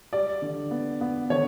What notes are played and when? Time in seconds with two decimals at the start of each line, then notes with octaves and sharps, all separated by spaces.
0.13 G3 D5
0.42 D3
0.71 B3
1.01 B3
1.30 D3 C#5